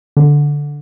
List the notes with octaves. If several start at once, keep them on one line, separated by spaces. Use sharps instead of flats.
D3